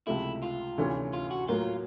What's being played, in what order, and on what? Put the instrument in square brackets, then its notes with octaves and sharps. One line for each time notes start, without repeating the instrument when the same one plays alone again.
[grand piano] C#2 C3 F3 A3 [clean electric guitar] E4
[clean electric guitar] F4
[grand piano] D2 C3 E3 A3 C#4
[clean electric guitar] F4
F#4
[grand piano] A2 F#3 A#3 [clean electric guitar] F4